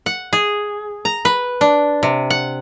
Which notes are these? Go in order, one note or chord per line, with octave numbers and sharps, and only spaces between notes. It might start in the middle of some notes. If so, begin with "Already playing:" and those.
F#5
G#4
A#5
B4
D4
C3
F#5